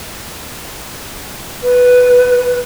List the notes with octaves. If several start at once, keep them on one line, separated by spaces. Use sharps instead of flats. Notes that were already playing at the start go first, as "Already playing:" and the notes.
B4